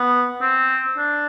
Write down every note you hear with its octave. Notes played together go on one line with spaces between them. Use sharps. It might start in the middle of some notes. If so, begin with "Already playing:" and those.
Already playing: B3
C4
D4